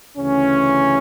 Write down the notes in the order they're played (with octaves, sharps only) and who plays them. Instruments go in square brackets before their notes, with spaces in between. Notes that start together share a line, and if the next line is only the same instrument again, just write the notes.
[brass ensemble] D2 C#3 E3 C#4